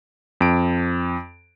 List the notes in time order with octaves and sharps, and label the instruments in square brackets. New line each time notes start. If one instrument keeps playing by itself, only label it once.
[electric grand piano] F2 D7